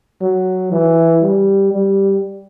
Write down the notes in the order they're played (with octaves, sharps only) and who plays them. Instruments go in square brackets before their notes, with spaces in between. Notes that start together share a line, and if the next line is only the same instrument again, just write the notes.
[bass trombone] F#3
E3
G3
G3